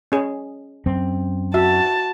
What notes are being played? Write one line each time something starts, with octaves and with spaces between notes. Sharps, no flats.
C#4 G#4
F#2 C4
F#4 E5 A5